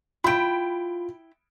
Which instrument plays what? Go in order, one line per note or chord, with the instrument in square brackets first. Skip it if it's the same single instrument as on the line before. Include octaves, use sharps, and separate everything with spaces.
[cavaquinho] E4 G5 [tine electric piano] F4 [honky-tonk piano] B5 D7